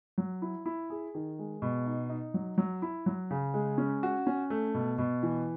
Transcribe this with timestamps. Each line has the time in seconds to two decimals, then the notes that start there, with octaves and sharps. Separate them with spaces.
0.18 F#3
0.42 E4
0.66 E4
0.90 G#4
1.15 D#3
1.39 G#3
1.62 B2
1.86 D#4
2.10 D#4
2.34 F#3
2.58 F#3
2.82 E4
3.06 F#3
3.31 C#3
3.54 G#3
3.78 C#4
4.03 F#4
4.27 C#4
4.50 A3
4.74 B2
4.98 B2
5.23 E3